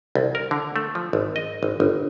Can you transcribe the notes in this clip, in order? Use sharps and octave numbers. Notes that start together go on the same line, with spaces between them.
C2
A#4
D3
A3
F3
G#1
D#5
G#1
G1